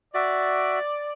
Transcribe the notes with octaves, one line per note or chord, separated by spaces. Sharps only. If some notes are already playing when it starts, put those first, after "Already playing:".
F#4 D5 E5